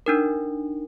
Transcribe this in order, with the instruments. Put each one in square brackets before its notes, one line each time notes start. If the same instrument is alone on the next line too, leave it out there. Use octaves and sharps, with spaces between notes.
[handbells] D4 D#4 A#4